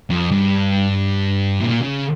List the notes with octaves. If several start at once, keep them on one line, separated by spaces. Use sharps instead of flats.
F2
G2
A#2
C#3